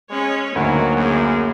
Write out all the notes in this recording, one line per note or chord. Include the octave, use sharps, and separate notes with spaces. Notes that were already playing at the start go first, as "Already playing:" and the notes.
G#3 C#4 C#5
D2 D#3 F#3 A#3
F#2 G#4